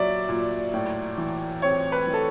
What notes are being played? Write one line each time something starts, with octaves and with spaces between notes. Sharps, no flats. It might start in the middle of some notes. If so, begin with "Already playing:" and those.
Already playing: A#2 F#3 D5 E5
A#2
A2
E3
C4 C#5
B4
E3
A4